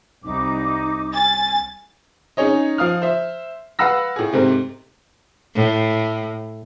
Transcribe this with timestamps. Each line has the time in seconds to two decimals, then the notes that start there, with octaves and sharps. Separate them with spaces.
0.25 C2 D#4 D6
1.14 G#5 A6
2.37 C#4 D#4 G#4 C#5 D#5
2.78 F3 F5 D#6 F6
3.02 C5 E5
3.79 B4 F5 F#5 B5 E6 A#6
4.16 A2 G#4
4.33 G#2 C3 A3 C4
5.55 A2